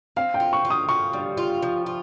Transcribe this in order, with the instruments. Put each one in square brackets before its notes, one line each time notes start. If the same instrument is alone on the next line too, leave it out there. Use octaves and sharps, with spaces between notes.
[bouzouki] C4 [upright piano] F5
[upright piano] G5
[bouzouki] F4
[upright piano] C#6
[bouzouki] F4
[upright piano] D#6
[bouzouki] F4 [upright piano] C#6
[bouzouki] G3
F4
F3
F4